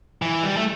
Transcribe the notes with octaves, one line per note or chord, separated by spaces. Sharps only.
E3
G3
A3